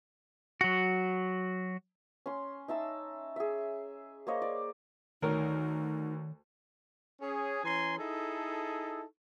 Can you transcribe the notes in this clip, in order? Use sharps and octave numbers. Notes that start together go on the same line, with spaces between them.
F#3 F#4
C#4 C6
D#4 E5 A5 E6
G#4 E5
A#3 C5 C#5 D#5
D5
D2 D#3 D#4 A#4 C#5 A#5
C#4 G#4
E3 C#4 G#5 A#5 C6
D#4 E4 G#4 A4